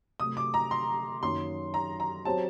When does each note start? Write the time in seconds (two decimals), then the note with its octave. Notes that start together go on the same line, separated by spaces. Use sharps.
0.19 C3 F#3 A3 D#6
0.37 D6
0.54 A#5
0.71 C6
1.22 F#2 D#3 F#3 A#3 C6
1.74 A#5
2.00 A#5
2.25 F#3 C4 G4 A5